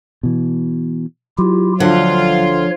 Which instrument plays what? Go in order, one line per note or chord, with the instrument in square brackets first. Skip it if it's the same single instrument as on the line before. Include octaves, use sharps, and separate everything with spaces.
[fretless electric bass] B2 E3
[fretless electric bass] F#3 [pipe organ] E4 F4 G4
[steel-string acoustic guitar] D2 D3 F#5 [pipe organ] F3 C#5 [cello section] F4